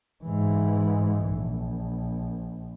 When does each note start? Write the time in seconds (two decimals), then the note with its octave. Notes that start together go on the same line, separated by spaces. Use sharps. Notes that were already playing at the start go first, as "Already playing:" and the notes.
0.25 G#2 E3
1.28 A#1